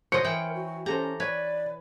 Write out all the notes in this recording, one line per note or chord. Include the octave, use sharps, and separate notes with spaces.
C5 C#5 D#5 C#7
E3 A#4 G5
F#4
C#4 G4 A4 C5 A#5
B4 C#5 D5